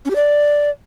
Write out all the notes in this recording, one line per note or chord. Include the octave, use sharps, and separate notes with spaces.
C#4
G4
D5